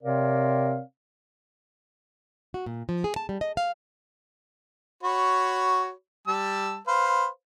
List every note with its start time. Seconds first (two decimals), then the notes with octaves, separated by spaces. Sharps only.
0.03 C3 C4 A#4 C#5 D5 F5
2.54 F#4
2.66 A#2
2.89 F3
3.04 G#4
3.16 A5
3.29 G3
3.41 D#5
3.57 F5
5.03 F#4 C#5 B5
6.27 G3 A5 E6
6.88 B4 C5 F5